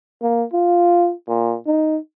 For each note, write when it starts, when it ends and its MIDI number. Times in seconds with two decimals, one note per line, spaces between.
0.22 0.44 58
0.53 1.13 65
1.27 1.56 46
1.66 1.98 63